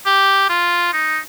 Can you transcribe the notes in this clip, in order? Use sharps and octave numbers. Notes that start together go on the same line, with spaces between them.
G4
F4
D#4